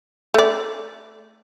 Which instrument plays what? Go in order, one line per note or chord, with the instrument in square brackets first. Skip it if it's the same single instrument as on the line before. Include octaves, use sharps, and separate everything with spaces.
[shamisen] A3 D5